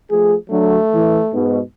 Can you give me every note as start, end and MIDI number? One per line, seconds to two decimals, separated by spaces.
0.10 0.35 53
0.10 0.35 57
0.10 0.35 68
0.50 0.77 50
0.50 0.77 54
0.50 1.36 57
0.93 1.18 52
1.33 1.61 44
1.33 1.61 47